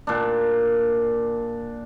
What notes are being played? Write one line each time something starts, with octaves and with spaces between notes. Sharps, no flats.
A#2 D4